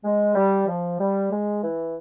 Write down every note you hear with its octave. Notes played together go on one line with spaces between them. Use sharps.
G#3
G3
F3
G3
G#3
E3